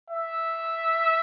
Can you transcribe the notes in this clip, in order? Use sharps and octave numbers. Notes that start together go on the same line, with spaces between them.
E5